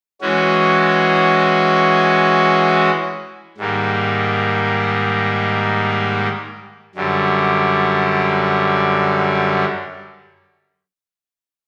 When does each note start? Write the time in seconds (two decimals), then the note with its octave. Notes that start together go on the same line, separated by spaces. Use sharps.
0.21 E3 G#3 C#4 F#4
3.58 G#2 D#3 G3 A#3
6.95 F#2 D3 G3